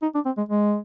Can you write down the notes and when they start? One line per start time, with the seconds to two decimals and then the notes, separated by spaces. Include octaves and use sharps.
0.02 D#4
0.14 D4
0.25 C4
0.37 G#3
0.49 G#3